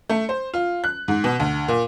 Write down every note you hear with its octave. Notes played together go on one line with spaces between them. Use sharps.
A3
C5
F4
F#6
G#2
B2
D2
A#2